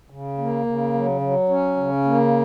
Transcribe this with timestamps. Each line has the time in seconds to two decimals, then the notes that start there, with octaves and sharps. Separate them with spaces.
0.10 C#3
0.38 A#3
0.66 C#3
0.94 F#3
1.21 F#3
1.49 C#4
1.77 C#3
2.05 A#3